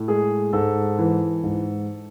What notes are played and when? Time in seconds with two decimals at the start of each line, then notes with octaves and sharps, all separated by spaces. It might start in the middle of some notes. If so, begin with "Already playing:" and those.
Already playing: A2
0.08 G#3 G#4
0.53 G#2 A4
0.99 E3
1.43 G#2